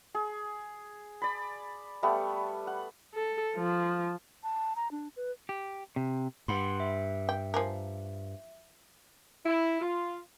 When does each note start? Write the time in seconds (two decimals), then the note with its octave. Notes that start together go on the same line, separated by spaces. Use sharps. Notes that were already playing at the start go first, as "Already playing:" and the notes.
0.15 G#4
1.22 D5 B5
2.03 G3 A3 B3
2.67 F#5
3.14 A4
3.56 F3
4.43 A5
4.76 A#5
4.91 D4
5.16 B4
5.49 G4
5.96 C3
6.48 G2 F#5 B5 C6
6.80 E5
7.29 G5
7.54 F3 G#4 A#4
9.45 E4
9.81 F4